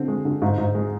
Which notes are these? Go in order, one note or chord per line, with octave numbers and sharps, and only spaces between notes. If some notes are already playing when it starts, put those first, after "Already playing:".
Already playing: D3 C4
G#3
D3
G#2
G#2
G#3